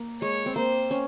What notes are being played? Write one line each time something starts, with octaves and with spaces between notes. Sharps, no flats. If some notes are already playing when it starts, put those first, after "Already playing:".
Already playing: A#3
G#3 C#5
C4
A#3 C5
C#4